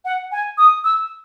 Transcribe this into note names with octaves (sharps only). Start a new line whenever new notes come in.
F#5
G#5
D#6
E6